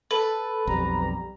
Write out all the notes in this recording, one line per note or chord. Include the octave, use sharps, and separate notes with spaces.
A4 B4
B1 F2 G3 A#5